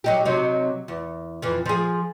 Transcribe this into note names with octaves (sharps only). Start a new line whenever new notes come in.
F#3 D#4 G4
C3 F#3 D#4
E2
F2 E3
F3 G#4